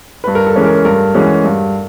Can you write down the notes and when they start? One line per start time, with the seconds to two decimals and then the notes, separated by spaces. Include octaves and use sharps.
0.24 G2 B4
0.35 A#4
0.47 A4
0.56 E3 G#3 C#4
0.66 A#4
0.85 G2 A#4
1.14 E3 G#3 C#4 F#4
1.44 G2